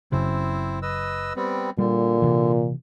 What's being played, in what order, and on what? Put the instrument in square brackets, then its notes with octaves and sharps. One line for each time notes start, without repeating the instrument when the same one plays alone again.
[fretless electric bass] F#1 F#2 C#3 [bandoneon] C4 E4 C5
[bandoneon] B4 D#5 E6
G3 B3 C4
[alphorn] A#2 [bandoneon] D3 [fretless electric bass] G3
[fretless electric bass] C3 E3